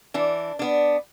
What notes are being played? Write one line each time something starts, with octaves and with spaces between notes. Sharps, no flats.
E3 D4
B3 D4